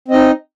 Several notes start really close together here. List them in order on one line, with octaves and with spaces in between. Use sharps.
C4 D#5 D#4